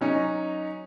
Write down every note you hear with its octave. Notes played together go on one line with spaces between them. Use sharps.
F#3 C#4 D#4